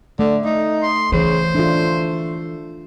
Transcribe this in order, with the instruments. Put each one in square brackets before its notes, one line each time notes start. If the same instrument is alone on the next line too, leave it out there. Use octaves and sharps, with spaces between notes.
[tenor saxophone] D3 [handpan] A3
[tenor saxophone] D#4
[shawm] C6
[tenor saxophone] C#3 [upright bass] E3 [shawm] C5
[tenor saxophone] A3 [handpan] D4 F4